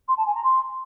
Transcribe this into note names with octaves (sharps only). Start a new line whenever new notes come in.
C6
A5
G#5
A#5
C6